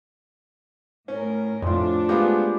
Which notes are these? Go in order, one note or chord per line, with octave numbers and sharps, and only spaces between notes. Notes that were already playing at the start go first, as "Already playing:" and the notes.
A2 C#4 A#4
F2 A2 A3 C4 D4 F4
G#3 B3 F4 G4